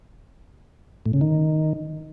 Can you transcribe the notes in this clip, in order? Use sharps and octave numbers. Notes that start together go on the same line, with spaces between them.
A2
C#3
D#3